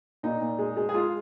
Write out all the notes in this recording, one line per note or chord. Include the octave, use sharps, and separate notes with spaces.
A#2 D#4
A#2
G#3
G#3
G#4
G#3 F4